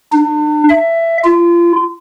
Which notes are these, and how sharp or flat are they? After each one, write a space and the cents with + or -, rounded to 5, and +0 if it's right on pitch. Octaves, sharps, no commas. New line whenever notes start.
D4 +40
E5 +15
F4 -30